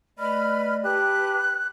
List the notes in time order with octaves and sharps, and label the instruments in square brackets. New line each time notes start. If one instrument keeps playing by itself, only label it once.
[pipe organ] A3 D5 D#5 [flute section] B4 B5 F6
[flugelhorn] G4 [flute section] B4 [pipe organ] A5 [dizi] F#6